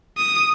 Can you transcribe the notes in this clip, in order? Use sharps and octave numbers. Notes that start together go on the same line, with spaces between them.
D#6